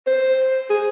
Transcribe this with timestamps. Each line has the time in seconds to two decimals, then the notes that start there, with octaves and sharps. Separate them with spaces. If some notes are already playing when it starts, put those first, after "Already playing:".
0.07 C5
0.70 G#4